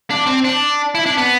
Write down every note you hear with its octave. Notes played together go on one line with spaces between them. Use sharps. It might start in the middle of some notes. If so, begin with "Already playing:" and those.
D4
C4
D4
E4
D4
B3